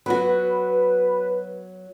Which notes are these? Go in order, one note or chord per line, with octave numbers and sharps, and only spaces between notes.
F#3 B3 F#4 B4